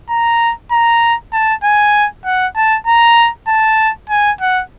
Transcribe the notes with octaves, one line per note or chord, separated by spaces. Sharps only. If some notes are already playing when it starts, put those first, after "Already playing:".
A#5
A#5
A5
G#5
F#5
A5
A#5
A5
G#5
F#5